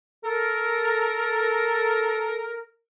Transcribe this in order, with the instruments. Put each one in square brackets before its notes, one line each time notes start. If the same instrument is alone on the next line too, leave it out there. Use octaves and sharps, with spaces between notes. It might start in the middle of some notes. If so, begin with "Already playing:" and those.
[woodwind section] A4 A#4